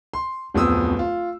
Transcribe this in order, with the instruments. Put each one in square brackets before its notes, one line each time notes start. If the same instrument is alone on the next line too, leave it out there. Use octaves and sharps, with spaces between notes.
[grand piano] C6
D1 F2 B3 D#6 E6
F4